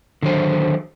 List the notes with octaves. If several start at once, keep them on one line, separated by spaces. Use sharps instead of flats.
D3 D#3 F#3 G#4 C5